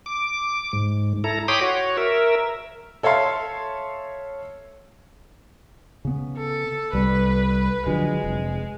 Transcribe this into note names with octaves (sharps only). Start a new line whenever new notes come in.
D6
G#2
E4 A4 A#5
C#5 G5 B5 C6 D6 D#6
F#4 C#5
A#4 E5
A4 C#5 E5 F5 C6
C#3 B3
A4
C2 G3 B4
D3 F3 F#3 G#3
F1